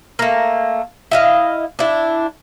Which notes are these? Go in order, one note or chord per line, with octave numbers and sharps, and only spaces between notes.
A3 A#3
E4 D#5 F5
D4 E4